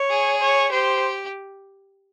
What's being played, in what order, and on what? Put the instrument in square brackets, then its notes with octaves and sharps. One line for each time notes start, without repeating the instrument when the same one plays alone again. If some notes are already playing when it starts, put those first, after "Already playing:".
Already playing: [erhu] C#5
[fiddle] G#4
[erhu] C#5
[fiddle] G4 [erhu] C5